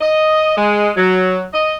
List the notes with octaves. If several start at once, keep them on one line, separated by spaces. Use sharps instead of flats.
D#5
G#3
F#3
D#5